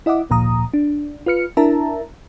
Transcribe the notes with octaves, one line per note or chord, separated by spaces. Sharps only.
E4 D#5 E5 F#5 D6
G#1 D2 A#2 F3 A#5 D#6
D4
F4 B4 F6 C#7
D4 E4 A#4 E5 A5 A#5